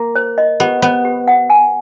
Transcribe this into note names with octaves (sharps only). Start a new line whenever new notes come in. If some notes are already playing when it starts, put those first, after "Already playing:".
Already playing: A#3
C5
D#5
B3 G4
B3 C5
G4
F#5
G#5